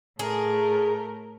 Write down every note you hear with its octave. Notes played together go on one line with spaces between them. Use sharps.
A2 A3 G#4 A#4